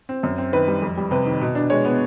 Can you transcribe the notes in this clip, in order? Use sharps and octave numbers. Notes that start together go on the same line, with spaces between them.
C4
F#2
C4
D#3 B4
G3
F2
G3
C3 B4
D#3
B2
D4
G#3 C#5
B3